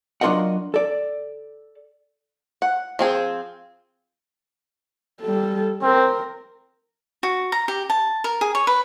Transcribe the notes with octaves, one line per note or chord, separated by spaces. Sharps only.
F#3 D4 F4 A#4 D#5 F#5
A4 D5
F#5
F3 C4 G#4
G3 A4
C4 A#4
F#4
A#5
G4
A5
A#4
G#4
C#5
B4